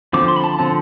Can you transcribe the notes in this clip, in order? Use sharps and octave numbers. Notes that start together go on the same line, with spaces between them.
D3 F3 C4 D6
C6
B5
A5
D3 F3 C4 A5